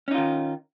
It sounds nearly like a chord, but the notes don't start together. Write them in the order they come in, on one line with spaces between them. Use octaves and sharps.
C#4 D#4 F4 D#3